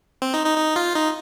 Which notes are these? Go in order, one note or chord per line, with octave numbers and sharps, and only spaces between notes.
C4
D#4
D#4
D#4
F4
D#4